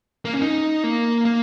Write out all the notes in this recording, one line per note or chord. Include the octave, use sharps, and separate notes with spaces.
A#3
C#4
D#4
A#3
A#3